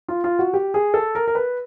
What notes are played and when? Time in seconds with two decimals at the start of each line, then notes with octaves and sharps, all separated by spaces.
0.08 F4
0.24 F4
0.39 F#4
0.54 G4
0.74 G#4
0.94 A4
1.15 A#4
1.27 A#4
1.35 B4